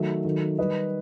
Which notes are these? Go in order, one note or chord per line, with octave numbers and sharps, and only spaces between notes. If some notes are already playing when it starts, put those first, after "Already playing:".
Already playing: D#3 F#3 A3
D#3 F#3 A3
D#3 G3 B4 D#5